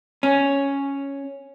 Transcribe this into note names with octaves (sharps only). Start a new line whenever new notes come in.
C#4